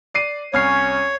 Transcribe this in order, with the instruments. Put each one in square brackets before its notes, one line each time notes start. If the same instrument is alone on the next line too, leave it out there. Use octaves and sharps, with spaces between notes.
[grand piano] D5 C7 D#7
[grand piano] C2 F6 C7 [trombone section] C#4 [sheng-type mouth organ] C#5